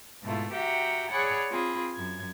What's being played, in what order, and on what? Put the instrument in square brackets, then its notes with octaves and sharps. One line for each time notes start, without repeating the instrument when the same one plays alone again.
[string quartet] G#2 B2 A3 E4 F4
F#4 G4 E5 F#5 G5 A#5
G#4 C#5 D5 F#5 B5 F#6
C4 F4 G#4 B5
F#2 G#6